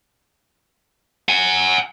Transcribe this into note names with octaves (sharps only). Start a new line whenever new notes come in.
F#5 G#5